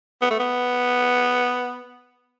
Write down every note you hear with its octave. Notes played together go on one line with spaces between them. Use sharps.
B3
A3
B3